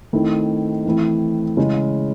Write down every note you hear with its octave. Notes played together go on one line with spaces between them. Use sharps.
D#3 A3 C4 E4
E3 A3 C4 E4
C#3 G#3 C#4 E4